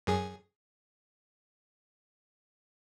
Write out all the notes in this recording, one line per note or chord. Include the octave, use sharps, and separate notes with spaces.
F#2 G#4